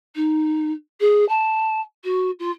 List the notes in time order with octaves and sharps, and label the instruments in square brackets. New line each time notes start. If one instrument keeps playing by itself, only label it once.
[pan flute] D#4
G#4
A5
F#4
F4